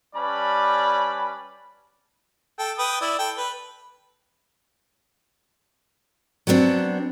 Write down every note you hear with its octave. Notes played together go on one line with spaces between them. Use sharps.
G3 C#4 B4 D5 A5 B5
A4 G5
B4 G5 D#6
E4 D5
A4 G5
B4
F#3 B3 C4 D4